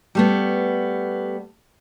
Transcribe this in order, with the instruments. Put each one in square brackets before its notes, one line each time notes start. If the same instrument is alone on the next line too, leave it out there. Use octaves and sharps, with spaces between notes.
[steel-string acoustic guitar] G3 A3 B3